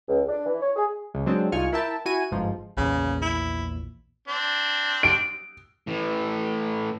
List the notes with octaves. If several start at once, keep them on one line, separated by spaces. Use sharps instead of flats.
C#2
D4
E3
C#5
G#4
C#2
F#3 G#3 C4 D4
C2 D#4 F4 G#5 C#6 F6
E4 A#4 E5 G5 A5
E4 F#4 G#5 D#7
G1 G#2 F3 F4
A#1 E2 A#2 C#3
E4
C4 D4
D7
A2 E3